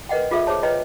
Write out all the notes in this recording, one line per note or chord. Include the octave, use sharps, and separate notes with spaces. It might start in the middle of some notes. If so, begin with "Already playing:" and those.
A#4 B4 D#5 F#5 G5
F4 G#4 A4 E5
G#4 C5 C#5 A5
B4 C#5 D#5 G5 A#5